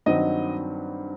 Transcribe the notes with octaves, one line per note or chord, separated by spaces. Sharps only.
G2 D#3 F#3 C4 D#5